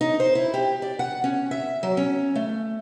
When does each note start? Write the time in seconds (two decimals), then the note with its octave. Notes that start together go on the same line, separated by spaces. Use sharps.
0.01 D#4
0.20 C5
0.35 E4
0.54 G4
0.82 D5
0.99 F#5
1.24 C#4
1.51 E5
1.83 F#3
1.97 C#4
2.35 A3